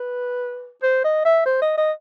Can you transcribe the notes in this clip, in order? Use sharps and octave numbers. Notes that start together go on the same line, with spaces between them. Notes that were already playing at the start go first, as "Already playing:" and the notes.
Already playing: B4
C5
D#5
E5
C5
D#5
D#5